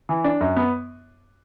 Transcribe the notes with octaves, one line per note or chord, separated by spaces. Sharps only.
E3
D4
F#2
B3